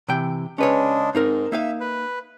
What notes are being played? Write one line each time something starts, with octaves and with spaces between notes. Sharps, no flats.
C3 E3 G5
C#3 G#3 C#4 D4 B4 C#5
G#2 C4 D#4 A#4
A#3 D#4 E5 F5
B4